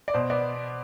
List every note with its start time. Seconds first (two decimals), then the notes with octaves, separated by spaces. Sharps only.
0.08 D5
0.14 B2 C5
0.30 B3 D5